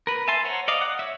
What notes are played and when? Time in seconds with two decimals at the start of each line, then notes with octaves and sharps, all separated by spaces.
0.07 A#4 B4
0.28 E5 G#5 A5 C6
0.44 C5 C#5 F#5 A#5 C6
0.68 D5 D#5 F5
0.81 F#5
0.99 C#5 E5